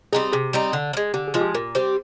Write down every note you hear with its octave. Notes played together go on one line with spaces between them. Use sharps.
G3 C4 D#4 G#4
C3 G#4
G3 C4 D#4
D3
F3
G#3
D3 G4
G#4
F3 G#3 F4
G4
A#2 A#4
G3 C4 G4 C5